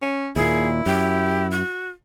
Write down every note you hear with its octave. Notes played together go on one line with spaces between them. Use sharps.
C#4
D#2 A#2 E4 G#4
F#2 G4
F#4